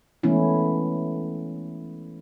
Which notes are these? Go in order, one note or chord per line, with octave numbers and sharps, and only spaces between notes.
E3 G#3 A3 B3 C#4 E4